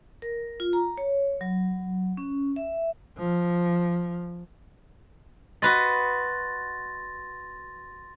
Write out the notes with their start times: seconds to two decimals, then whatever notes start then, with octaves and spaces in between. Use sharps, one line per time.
0.22 A#4
0.60 F4
0.73 A#5
0.98 C#5
1.41 F#3
2.17 C#4
2.56 E5
3.17 F3
5.62 F#4 B4 D#5 C6 A6 A#6